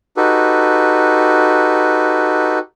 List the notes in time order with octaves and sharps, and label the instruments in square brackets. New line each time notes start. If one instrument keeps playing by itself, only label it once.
[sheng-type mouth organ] D#4 F#4 G4 A4 B4